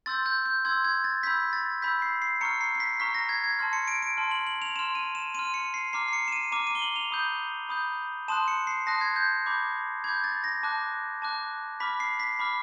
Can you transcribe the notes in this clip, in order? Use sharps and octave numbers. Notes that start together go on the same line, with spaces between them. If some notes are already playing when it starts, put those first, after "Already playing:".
C6 E6 G6 A6
G6
G6
C6 E6 G6 G#6
G#6
A6
B5 E6 G6 B6
A6
B5 E6 G6 B6
C7
C7
A#5 C#6 F6 C#7
C7
C7
B6
A#5 C#6 F6 B6
A#6
G#6
G#6
A5 C6 F6
C#7
D7
D7
A5 C6 F6
F#7
F#7
F7
C6 F6 E7
D#7
E7
C6 F6 D#7
C#7
C7
A#5 D6 F6 C7
C7
C#7
E7
D#7
A#5 D6 F6 D#7
D#7
G7
F#7
F7
B5 D#6 G6
B5 D#6 G6
A5 C6 D#6 F#6 E7
C#7
C7
A5 C6 D#6 F#6 A#6
G#6
G6
B5 D6 G6
B5 D6 G6 G#6
A6
A#6
A5 D6 F#6
A5 D6 F#6
B5 D6 F6 B6
C7
B6
B5 D6 F6